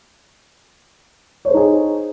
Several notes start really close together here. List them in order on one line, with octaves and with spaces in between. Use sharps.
C#5 C5 A4 D#4 G#4